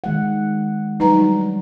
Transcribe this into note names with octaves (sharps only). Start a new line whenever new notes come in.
D#3 G#3 F#5
F#3 G3 D#4 B4 A#5